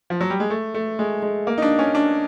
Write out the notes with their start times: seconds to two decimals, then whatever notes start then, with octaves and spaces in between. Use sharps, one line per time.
0.10 F3
0.21 F#3
0.30 G3
0.40 G#3
0.50 A3
0.74 A3
0.99 G#3
1.22 G#3
1.47 A#3
1.58 D#4
1.62 D4
1.79 C#4
1.95 D4